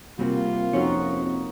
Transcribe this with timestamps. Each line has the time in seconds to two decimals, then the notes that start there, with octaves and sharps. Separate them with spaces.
0.19 C3 G3 A#3 C4 F4 F#4
0.73 F2 C4 C#4 D#4 F#4 C#5